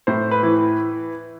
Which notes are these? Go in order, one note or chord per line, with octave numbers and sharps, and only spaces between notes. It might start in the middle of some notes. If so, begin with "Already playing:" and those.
A2 C5
B4
E3